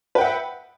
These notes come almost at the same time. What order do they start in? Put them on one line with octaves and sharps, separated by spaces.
B4 G5 F#5 E5